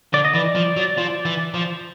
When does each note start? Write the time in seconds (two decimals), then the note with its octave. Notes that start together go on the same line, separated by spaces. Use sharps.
0.13 D3 D5
0.25 D#5
0.35 E3 D5
0.55 F3
0.77 F#3
0.98 F3
1.25 E3
1.54 F3